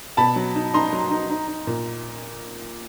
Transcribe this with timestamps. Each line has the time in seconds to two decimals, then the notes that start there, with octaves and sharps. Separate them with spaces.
0.17 B2 A5 B5
0.36 F#3
0.55 D#4
0.74 D#4 A#5 C6
0.93 F#3
1.11 D#4
1.30 D#4
1.47 D#4
1.67 A#2